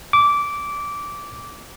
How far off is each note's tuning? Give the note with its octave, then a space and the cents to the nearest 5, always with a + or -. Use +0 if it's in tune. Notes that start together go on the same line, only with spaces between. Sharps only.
D6 -15